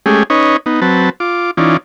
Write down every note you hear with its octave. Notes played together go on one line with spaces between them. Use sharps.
G#3 A3 C#4 G4 G#4
C#4 D#4 B4 C#5 D#5
B3 D#4
F#3 C4 B4 A5
F4 D6
E3 C#4 D#4 F4 D5